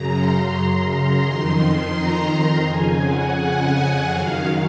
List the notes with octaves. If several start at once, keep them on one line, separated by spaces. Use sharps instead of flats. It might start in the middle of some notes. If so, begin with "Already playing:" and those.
Already playing: F#2 C#3 A#5
C6
C6
F2 D#3
A#5
F2 C#3 G#5
F#5
F#2 D#3 F5